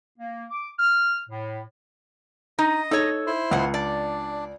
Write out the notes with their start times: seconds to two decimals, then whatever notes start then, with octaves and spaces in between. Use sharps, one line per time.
0.18 A#3
0.50 D6
0.79 F6
1.29 A2
2.59 D#4 D#5
2.91 D#4 A4 C#5
3.27 E4 C5
3.51 C#2 G#3 B3 F#5
3.74 D4 D5